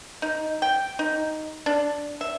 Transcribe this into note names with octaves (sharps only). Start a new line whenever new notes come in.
D#4
G5
D#4
D4
E5